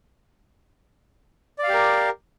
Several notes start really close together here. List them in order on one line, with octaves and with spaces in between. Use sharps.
D5 F5 G4 A#4